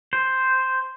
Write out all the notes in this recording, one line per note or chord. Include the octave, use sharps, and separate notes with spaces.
C5